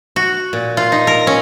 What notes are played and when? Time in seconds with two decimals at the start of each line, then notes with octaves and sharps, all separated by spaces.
0.16 F#4
0.53 A#2
0.77 F4
0.92 D#4
1.07 A#4
1.27 C#4